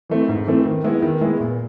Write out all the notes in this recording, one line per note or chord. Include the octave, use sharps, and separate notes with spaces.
E3 A3 C4
G#2
E3 A3 C4
D#3
G#3 B3 E4
D#3
G#3 B3 E4
A#2